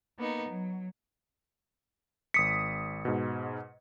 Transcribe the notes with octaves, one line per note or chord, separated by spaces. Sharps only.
A#3 B3 D#4
F#3
G#1 D#6 B6 C#7
G#2 B2